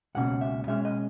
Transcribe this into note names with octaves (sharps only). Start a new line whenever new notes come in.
C#2 B2 A#3 C#4 F#5
E5
B2 G#3 C#4 E5
D#5